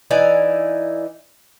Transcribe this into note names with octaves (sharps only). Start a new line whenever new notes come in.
E3 D#4 D5 G#5